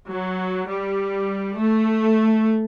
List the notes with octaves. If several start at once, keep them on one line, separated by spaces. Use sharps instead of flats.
F#3
G3
A3